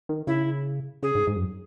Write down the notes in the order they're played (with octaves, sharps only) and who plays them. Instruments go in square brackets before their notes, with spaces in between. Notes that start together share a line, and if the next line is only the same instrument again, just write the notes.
[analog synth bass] D#3
[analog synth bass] C#3 [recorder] E4
[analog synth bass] C#3 [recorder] G#4
[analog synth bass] G#2
G#2
F#2